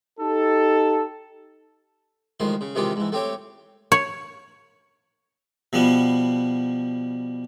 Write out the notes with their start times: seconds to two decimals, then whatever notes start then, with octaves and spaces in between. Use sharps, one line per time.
0.20 D#4 G4 A4
2.40 A1 D#3 F3 G#3 C6
2.61 C#3
2.75 C3 D#3 E3 G#3 F4 G4
2.96 G#2 E3
3.12 A3 C4 G4 C#5 G5
3.92 C#5
5.73 B2 F3 G3 B3